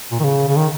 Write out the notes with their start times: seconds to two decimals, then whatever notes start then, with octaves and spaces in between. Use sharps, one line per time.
0.11 A#2
0.20 D#3
0.23 C#3
0.48 C#3
0.56 D#3